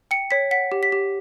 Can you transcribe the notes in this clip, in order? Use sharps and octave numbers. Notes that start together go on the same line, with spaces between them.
G5 C#7
C#5 B6
F#5 B6
G4
B6
G4